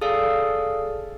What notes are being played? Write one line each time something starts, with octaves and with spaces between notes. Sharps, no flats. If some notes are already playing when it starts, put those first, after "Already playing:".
G#4 A4 D5 F5